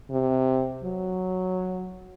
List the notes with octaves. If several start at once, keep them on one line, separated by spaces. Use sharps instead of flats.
C3
F#3